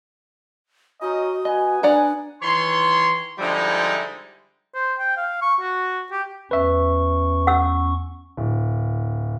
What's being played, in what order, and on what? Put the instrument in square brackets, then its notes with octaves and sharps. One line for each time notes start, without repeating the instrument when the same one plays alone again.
[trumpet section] C#4 D#4 D#5 [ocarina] F#4
[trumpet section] B3 G#5 [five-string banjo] D#5
[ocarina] D4 [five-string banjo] D5 F#5 A#5
[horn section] D#3 E3 C#5 C6
D3 F3 G3 G#3 D#4 E4
[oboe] C5
G5
F5
C#6
F#4
G4
[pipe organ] E2 C#4 C#6 [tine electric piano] B4 E5
[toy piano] F#5 E6
[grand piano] D1